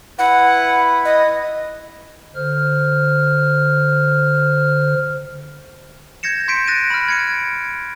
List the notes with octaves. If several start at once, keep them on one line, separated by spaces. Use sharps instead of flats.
E4 B4 F#5
D#5
D3 C5 F6
G6 G#6 A#6 C#7 E7
C6 G6 B6 C#7 D7
F#6 A6 A#6 D7 D#7
B5 F6
G#6 C#7 D7